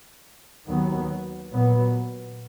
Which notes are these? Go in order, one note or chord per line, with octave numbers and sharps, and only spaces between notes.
D#2 D#3 F#3 B3
A#2 F#3 B3